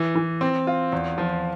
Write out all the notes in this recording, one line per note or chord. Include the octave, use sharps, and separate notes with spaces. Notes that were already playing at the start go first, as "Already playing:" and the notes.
Already playing: E3
E3
C4
F4
E2
F3